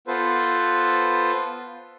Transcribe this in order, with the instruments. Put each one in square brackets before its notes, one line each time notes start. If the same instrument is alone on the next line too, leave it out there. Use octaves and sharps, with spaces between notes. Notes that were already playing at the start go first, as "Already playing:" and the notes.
[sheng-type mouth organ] B3 F4 A4 B4 C5